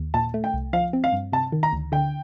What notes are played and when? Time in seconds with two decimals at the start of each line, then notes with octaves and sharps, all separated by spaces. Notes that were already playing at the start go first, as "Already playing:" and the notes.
Already playing: D#2
0.14 A#2 A5
0.34 A3
0.44 G5
0.54 C2
0.73 F3 F5
0.93 C4
1.04 F5
1.13 G2
1.32 C3 A5
1.52 D#3
1.63 A#5
1.72 D2
1.92 D3 G5